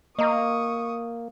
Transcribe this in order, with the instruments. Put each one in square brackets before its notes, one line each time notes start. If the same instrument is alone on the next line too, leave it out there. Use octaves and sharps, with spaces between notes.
[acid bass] A#3 [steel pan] D#5 A#5 [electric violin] C#6 D#6